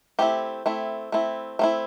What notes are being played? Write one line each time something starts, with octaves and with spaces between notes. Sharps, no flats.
A3 C4 E4 G4
A3 C4 E4
A3 C4 E4
A3 C4 E4